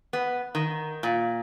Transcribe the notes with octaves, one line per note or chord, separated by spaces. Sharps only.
B3
D#3
A#2